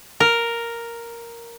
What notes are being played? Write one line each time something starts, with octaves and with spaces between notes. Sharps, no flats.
A#4